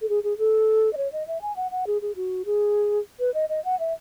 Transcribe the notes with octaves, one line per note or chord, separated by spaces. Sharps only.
A4
G#4
G#4
A4
D#5
C#5
D#5
E5
G#5
F#5
F#5
G#4
G#4
F#4
G#4
B4
D#5
D#5
F#5
E5